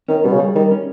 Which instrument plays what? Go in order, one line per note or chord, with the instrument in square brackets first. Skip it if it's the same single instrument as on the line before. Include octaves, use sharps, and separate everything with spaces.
[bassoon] D#3 [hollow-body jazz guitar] C#4
[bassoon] B2 [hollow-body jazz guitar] G3
[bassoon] C#3
[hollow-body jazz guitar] G3
[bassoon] D#3 [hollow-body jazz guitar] G3
[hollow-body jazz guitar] C#4